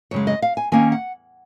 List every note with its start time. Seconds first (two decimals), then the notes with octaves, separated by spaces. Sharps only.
0.11 F#2 C#3 G#3 C#5
0.27 D#5
0.42 F5
0.57 G#5
0.72 D#3 A#3 C#4 G#5
0.92 F#5